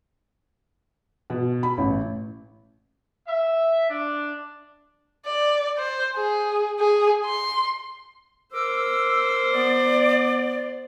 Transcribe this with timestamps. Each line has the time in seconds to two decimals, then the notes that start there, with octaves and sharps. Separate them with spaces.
1.30 B2
1.63 B5
1.78 A1
3.27 E5
3.89 D4
5.26 D5
5.78 C5
6.16 G#4
6.80 G#4
7.26 C6
8.53 A#4 C5 D6 E6
9.53 B3 D5